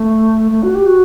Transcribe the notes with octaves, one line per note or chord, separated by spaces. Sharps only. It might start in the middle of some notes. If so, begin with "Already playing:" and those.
Already playing: A3
A3
F#4
G4
F#4